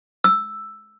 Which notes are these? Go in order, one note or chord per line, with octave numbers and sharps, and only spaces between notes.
E6